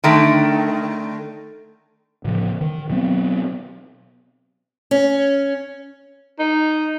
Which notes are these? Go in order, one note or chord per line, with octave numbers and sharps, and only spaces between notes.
D3 D#3 A3
A2 C#3 F3
D#3
B2 F#3 B3 C4
C#4
D#4